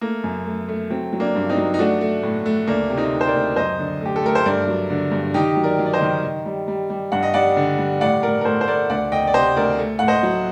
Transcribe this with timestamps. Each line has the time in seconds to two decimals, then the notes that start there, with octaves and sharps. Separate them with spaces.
0.01 A3 A#3
0.24 F#2
0.46 A3
0.69 A3
0.90 F#3 C4
1.13 F#3
1.20 A#3 D4
1.35 G2
1.49 C4 D#4
1.57 F#3
1.74 D#4
1.79 A3 D4 F#4
2.01 A3
2.23 A2
2.46 A3
2.67 D2 A#3 D4
2.90 C3
2.97 C4 D#4
3.13 D2
3.21 C5
3.27 A#4 D5
3.35 D2
3.56 F#2 C5 D#5
3.79 D3
4.01 A3 G4
4.16 A4
4.24 A3 A#4
4.35 C5
4.46 G2 A#4 D5
4.68 F#3
4.90 D3
5.12 G2
5.34 D#3 D#4 G4
5.56 F#3
5.64 A#4 D5
5.79 F#3
5.86 D5
5.93 C5 D#5
6.01 D#3
6.23 D#3
6.46 G3
6.68 G3
6.90 G3
7.12 G2 F#5
7.23 D#5
7.34 G3 D5 F#5
7.57 D3
7.78 G3
8.01 A2 D5 F#5
8.23 A2 A#4 D5
8.41 A#4
8.45 A2 A4 C5
8.61 C5
8.67 A3 A#4 D5
8.90 D2 D5 F#5
9.12 D2 D#5 G5
9.27 D5
9.34 C3 C5 D#5
9.56 D2 A#4 D5
9.79 A3
9.99 A2 F#5
10.08 C5 D#5
10.23 F#3